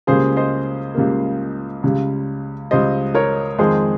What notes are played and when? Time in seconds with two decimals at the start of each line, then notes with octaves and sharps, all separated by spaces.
0.07 C#2 C#3 G3 A#3 G#4 C5
0.37 C5 D#5
0.95 C#2 C#3 G3 A#3
1.83 C#2 C#3 G3
2.71 C#2 C#3 G3 C5 D#5
3.14 A#4 C#5
3.59 F2 D#3 G#3 G#4 C5